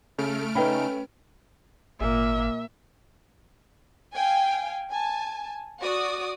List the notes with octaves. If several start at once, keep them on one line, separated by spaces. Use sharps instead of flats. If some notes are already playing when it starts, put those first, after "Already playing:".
C#3 A3 F6 D7
C#3 C#4 D#4 B4 G5 B5
G#1 A#2 A#3 E5
F5 G5 G#5
G#5 A5
F#4 D5 D#6